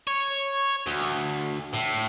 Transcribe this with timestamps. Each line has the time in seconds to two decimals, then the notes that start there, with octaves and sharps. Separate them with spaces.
0.07 C#5
0.87 D2
1.74 A2